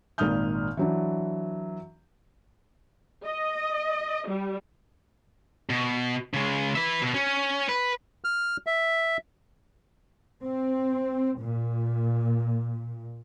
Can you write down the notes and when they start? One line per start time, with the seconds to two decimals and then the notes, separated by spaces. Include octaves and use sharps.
0.18 G#1 A#2 D#4 D#6 F6 G6
0.77 E3 F#3 D4
3.25 D#5
4.27 G3
5.70 B2
6.34 C#3 G#3
6.75 B4 E5
7.02 B2
7.14 C#4
7.69 B4
8.24 F6
8.67 E5
10.43 C4
11.40 A#2